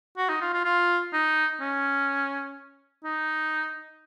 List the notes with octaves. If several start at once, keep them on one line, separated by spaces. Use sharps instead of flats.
F#4
D#4
F4
F4
F4
D#4
C#4
D#4